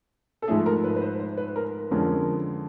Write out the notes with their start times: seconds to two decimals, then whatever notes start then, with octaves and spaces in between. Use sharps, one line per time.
0.42 A4
0.48 G#2 F3 A3 G#4
0.66 A#4
0.84 B4
0.96 B4
1.01 C5
1.20 C5
1.37 B4
1.56 A#4
1.91 F2 D3 F3 G#3 C#4 A#4